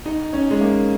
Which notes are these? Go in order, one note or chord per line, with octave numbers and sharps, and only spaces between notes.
D#4
C#4
G#3
A#3